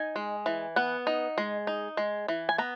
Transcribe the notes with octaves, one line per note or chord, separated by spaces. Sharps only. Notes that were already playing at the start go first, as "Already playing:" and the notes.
Already playing: D#4 G#5
G#3
E3
B3 F#5
D#4
G#3
D#4
G#3
E3
G#5
B3 A#5